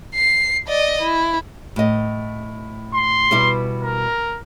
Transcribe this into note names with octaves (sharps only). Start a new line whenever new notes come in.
C7
D5 D#5
E4
A2 D#5
C6
B2 G3 E4
A#4